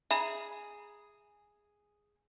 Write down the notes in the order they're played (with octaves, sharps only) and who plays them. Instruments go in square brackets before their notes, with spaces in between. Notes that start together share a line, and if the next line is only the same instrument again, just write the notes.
[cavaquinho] G#4 [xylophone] E5 A#5 B5